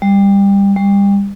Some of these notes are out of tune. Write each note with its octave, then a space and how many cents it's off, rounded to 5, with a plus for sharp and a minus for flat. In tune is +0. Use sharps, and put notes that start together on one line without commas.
G3 +20
G3 +30